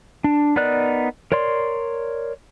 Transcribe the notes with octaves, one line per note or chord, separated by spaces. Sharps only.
D4
B3 D#4 A#4 D5 F#6
A#4 C#5 D5 C6